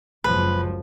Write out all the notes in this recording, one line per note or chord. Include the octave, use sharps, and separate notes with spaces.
F#1 C#2 F3 B4